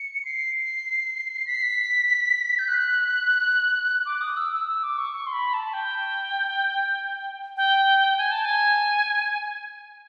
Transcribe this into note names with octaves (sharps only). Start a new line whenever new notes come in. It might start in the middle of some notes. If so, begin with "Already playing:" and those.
Already playing: C#7
C7
B6
C7
B6
G6
F#6
D6
D#6
E6
E6
E6
D6
C#6
C#6
C6
B5
A5
G5
G5
G#5
A5
G#5